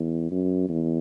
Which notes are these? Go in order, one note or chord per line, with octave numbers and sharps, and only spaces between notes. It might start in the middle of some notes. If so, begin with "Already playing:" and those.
Already playing: E2
F#2
E2